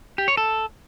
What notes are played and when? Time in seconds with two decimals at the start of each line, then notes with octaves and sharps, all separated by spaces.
0.18 G4
0.28 C#5
0.37 A4